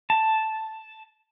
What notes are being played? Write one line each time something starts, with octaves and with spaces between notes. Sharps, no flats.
A5